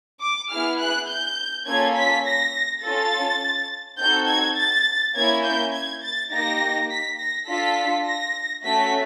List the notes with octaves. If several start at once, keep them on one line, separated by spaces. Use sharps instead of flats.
D6
B3 E4 G#4 F6
F#6
G6
A#3 C#4 F4 A4 G#6
B6
A#6
C#4 F4 A4 A6
C4 D#4 F#4 A4 G6
G#6
A6
A#3 C#4 E4 G#6
G6
G#6
A6
A#3 D#4 G4 A#6
B6
A#6
D4 F4 A4 B6
A#6
A3 C#4 F#4 A4 B6